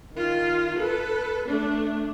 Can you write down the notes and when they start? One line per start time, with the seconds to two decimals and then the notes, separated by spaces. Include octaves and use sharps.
0.13 D#3 F4
0.79 A4 B4
1.48 A3 D4